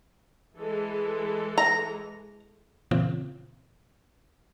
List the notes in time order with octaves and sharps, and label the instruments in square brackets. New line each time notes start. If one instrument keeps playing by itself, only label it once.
[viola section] E3 G#3 A4
[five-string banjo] A#5
[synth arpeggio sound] A#2 C#3 E3 C4 F4